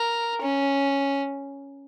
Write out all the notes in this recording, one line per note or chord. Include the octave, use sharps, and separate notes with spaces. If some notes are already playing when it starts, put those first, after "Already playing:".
Already playing: A#4
C#4